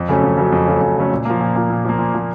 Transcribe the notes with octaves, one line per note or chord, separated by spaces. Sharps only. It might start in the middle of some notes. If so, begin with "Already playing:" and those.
Already playing: F2
C#3 F#3 A3 C#4
F2
C#3 F#3 A3 C#4
F2
C#3 F#3 A3 C#4
F2
C#3 F#3 A3 C#4
A#2
F3 A#3
A#2
F3 A#3
A#2
F3 A#3
A#2
F3 A#3